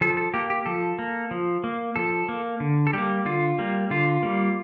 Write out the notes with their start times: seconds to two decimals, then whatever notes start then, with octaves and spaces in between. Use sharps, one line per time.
0.01 F3 A4
0.17 A4
0.34 A#3 G4
0.50 G4
0.66 F3 A4
0.99 A#3
1.31 F3
1.64 A#3
1.96 F3 A4
2.29 A#3
2.60 D3
2.87 A4
2.93 G3 A#3 G4
3.25 D3 F4
3.59 G3 A#3
3.91 D3 F4
4.23 G3 A#3